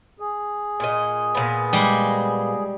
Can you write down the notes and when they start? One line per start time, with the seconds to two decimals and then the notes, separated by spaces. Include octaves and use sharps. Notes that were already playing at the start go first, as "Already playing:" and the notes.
0.20 G#4
0.80 A#2 D#5
1.35 A#2 B3
1.73 G3 G#3